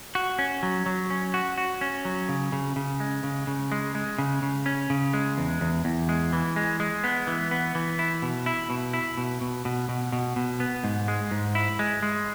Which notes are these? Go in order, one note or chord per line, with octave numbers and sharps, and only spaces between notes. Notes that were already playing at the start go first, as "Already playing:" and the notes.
F#4
C#4
F#3
F#3
C#4
F#4
F#4
C#4
F#3
C#3
C#3
C#3
G#3
C#3
C#3
G#3
G#3
C#3
C#3
C#4
C#3
G#3
E2
E2
E2
G#3
E3
G#3
G#3
B3
E3
B3
E3
E4
B2
E4
B2
E4
B2
B2
B2
B2
B2
B2
B3
G#2
G#3
G#2
E4
G#3
G#3